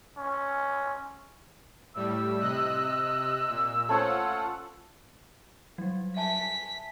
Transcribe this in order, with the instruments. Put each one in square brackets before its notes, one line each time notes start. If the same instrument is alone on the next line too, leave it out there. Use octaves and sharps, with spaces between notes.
[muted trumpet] C#4
[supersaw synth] A2 G3 [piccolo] E6
[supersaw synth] C3 D#5 F#6
A#2
[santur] A3 C#4 C5 [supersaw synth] F4 F#5
[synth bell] F#3 G3
[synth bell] E5 G#5 A5 [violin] B6